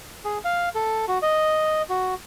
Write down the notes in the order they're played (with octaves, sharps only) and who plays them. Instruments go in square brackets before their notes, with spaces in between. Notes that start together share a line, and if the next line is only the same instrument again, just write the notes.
[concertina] G#4
F5
A4
F#4
D#5
F#4